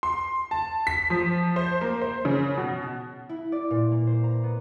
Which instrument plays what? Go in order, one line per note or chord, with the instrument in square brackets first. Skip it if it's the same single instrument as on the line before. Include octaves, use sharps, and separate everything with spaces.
[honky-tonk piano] C6
A5
B6
F3
C5
A#3
C5
C#3
B2
[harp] E4
D5
A#2
A#3
C5
A#5
B3